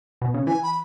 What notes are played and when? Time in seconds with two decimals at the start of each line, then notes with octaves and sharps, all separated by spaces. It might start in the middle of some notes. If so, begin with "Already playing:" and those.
0.21 B2
0.34 C#3
0.47 E3 G#5
0.63 B5